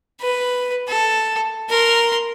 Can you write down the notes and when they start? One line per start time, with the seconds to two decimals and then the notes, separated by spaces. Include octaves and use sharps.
0.21 B4
0.88 A4
1.69 A#4 C6